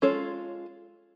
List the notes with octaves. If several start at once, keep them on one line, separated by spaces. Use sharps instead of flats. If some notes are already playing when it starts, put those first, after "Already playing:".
G#3 C#4 F4 A4 C#5